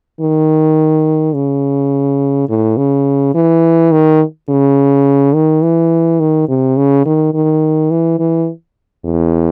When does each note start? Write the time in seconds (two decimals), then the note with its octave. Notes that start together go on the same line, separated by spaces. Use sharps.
0.21 D#3
1.34 C#3
2.49 A2
2.77 C#3
3.35 E3
3.92 D#3
4.49 C#3
5.34 D#3
5.62 E3
6.20 D#3
6.48 C3
6.77 C#3
7.05 D#3
7.34 D#3
7.91 E3
8.19 E3
9.05 E2